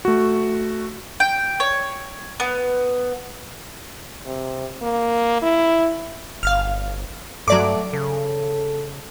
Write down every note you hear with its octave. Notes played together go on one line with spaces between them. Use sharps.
A3 F#4
G5
C#5
B3
C3
A#3
E4
G1 F5 F6
G2 F#3 A3 D5 D6
C#3 A4